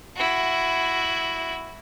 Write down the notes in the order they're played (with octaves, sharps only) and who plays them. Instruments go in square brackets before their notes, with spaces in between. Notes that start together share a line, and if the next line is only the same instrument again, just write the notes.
[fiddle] E4 F#4